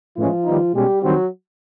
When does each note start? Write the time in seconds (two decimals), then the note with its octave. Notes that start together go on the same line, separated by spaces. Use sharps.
0.17 A2 E3 F3 G#3 C#4 F4
0.45 D#3 G3 B3 D#4
0.74 B2 G3 G#3 C#4 G4
1.02 D#3 F#3 G3 C4 F#4